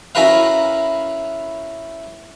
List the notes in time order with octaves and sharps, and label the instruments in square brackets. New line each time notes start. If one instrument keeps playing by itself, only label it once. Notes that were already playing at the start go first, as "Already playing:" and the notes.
[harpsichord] C#4 E4 F#4 A#4 B4 F5